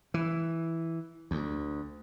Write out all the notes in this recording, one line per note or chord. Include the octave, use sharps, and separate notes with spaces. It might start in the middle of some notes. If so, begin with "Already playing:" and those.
E3
D2